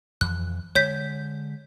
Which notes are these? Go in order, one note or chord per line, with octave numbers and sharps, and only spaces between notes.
F2 E3 F3 F#6
D3 G#3 C#5 G6 B6